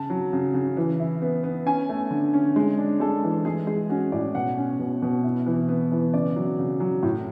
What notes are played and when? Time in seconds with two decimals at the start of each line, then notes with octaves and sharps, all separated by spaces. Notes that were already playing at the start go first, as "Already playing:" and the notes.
Already playing: C#3 A5
0.10 F#3
0.33 C#3
0.54 C#3
0.77 E3
1.00 E4
1.22 B3
1.43 B3
1.66 C#4 G#5
1.89 A3
2.11 D3
2.34 C#4
2.56 G#3
2.78 D4
3.00 G#3 A4
3.24 E3
3.45 G#3 G#4
3.67 G#3 G#4
3.89 C#4 F#4
4.12 A2 D5
4.35 B2 F#5
4.58 C#4
4.79 B2
5.02 B2
5.24 E4
5.46 E3
5.68 B3
5.92 E3
6.14 C#3 D5
6.36 F#3
6.59 C#3
6.80 F#3
7.03 A2